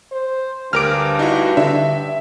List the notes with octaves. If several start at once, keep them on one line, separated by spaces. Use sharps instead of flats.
C5
D2 G2 A#4 D6 F6 D7
D#4 E4 F#4
D3 E5